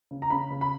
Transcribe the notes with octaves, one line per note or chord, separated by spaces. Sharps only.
C#3
A#5
C#3 B5
C#3
B5